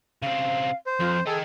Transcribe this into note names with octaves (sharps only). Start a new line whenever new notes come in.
C#3 C4 F5
C5
F2 F4
G#4 A4 D#5 G5